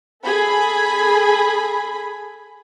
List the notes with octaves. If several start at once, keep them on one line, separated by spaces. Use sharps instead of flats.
G#4 A4 B5